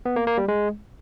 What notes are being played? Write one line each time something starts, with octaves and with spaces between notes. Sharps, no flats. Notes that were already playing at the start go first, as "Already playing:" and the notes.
B3
A#3
A#3
G3
G#3